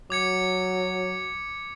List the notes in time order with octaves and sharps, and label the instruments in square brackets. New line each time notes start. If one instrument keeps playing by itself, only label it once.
[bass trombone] F#3 [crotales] D6 G#6 C#7